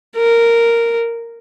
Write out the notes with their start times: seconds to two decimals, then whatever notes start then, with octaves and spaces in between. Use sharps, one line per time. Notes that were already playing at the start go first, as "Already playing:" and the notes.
0.16 A#4